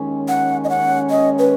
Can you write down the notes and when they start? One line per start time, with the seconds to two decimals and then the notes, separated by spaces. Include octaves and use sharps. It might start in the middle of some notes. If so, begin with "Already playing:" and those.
Already playing: D#2 D#3 G#3 C#4
0.28 F#5
0.64 D#5
0.70 F#5
1.10 D#5
1.39 B4